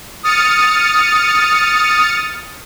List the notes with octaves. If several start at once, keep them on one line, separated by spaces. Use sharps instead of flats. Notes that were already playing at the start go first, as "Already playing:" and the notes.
D#6 F6 A6 C#7